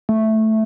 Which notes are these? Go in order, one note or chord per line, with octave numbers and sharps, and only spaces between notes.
A3